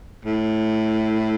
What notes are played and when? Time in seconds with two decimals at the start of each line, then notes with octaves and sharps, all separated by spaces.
0.25 A2